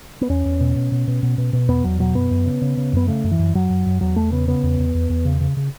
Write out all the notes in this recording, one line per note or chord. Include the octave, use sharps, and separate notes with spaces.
B3
E2 C#4
E2
B2
B2
B2
B2
B2
B2
B2
E2 B3
E2 F#3
B2 F#3
F#2 B3
F#2
C#3
C#3
C#3
F#2 B3
C#3 A3
F#2
E3
F#2
F#2 F#3
F#2
F#2
E2 F#3
E2 A3
C#3 B3
C#3 B3
E2
E2
E2
E2
C#3
C#3
C#3